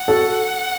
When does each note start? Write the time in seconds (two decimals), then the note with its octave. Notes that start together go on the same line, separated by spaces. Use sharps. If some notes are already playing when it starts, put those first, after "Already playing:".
Already playing: F#5
0.08 F#4 A4